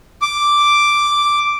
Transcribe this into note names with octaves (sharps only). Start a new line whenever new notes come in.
D6